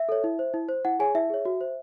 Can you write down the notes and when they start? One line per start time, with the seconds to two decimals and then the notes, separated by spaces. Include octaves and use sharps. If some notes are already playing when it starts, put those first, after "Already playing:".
Already playing: E5
0.09 A4 C#5
0.24 E4
0.39 C5
0.54 E4
0.69 C5
0.85 E4 F#5
0.99 G#4 C#5 G#5
1.15 E4 E5
1.30 G#4 C#5
1.45 F#4
1.61 C5